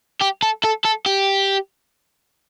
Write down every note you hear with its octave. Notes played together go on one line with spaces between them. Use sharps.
G4
A4
A4
A4
G4